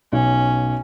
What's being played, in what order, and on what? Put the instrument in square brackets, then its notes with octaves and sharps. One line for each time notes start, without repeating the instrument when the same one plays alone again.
[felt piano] B1 [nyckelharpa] C#4